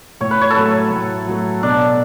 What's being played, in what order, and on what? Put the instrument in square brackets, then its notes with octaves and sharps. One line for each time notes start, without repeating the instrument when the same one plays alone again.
[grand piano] A2 [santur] C#5
[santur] B4
C#5
A4
[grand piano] F#3 A3 [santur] B4
[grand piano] A2
F#3 A3
[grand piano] B2 [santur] D4